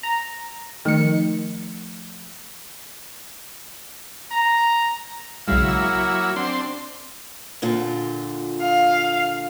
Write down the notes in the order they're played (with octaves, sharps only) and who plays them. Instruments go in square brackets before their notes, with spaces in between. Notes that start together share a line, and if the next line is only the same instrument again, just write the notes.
[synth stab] A#5
[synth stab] D#3 C#7 [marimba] F3 A3
[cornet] A#5
[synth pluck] B1 C#3 G#3 [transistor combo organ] F#3 E4 [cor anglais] F5
[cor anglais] A#3 [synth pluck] E6
[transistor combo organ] C4 D4 C6
[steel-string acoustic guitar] A#2 D3 F4
[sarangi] F5